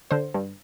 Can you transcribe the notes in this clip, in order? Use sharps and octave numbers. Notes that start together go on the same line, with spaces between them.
D3 C5
G2